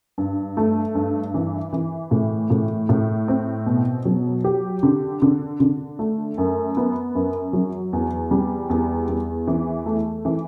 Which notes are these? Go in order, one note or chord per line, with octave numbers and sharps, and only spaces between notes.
G2
A3
G2
E3
E3
A2
A2
A2
C4
B2
F#3
G4
D3
D3
D3
A3
F#2
B3
F#2
F#3
E2
G3
E2
E2
E3
A3
E3